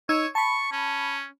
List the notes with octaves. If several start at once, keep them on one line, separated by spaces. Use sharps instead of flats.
D#4 C#5 E6 G#6
A5 B5 C#6
C#4